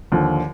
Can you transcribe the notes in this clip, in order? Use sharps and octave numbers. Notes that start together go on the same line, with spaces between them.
D#2 D3 F3